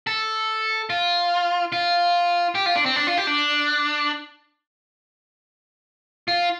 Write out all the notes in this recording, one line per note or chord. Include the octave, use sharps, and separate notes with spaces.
A4
F4
F4
G4
F4
D4
C4
D4
F4
G4
D4
F4